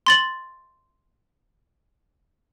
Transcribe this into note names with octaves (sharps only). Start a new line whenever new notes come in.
C6 A6 F#7